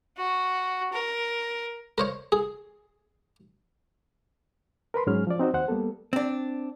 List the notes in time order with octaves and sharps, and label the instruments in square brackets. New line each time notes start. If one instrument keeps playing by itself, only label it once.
[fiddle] F#4
A#4
[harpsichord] A#4 C5 C#5
G#4
[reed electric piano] A#4 B4 B5 C6
G#2 F#3 C#4 G#4 F6
F3 D5
C4 D#4 F#4 C5
D#2 C5 F#5
G3 A#3 B3 A4
[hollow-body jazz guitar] C4 D4